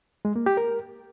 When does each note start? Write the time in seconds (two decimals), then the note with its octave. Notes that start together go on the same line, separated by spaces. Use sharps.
0.25 G#3
0.36 A#3
0.46 G4
0.57 A#4